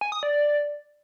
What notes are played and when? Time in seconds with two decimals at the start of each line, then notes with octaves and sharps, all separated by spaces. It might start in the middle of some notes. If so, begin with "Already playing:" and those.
0.01 G#5
0.12 D#6
0.23 D5